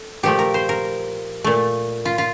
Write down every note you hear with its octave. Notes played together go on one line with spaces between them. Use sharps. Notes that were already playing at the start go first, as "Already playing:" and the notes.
Already playing: A4
A#2 F3 A3 G4
A#4
C5
A#4
A#2 A3
F4
F4